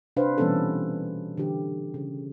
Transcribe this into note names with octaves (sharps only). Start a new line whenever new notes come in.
C3 D4 B4 C5 F5
B2 E3 G3 B3 C#4 A4
D3 E3 G4
C#3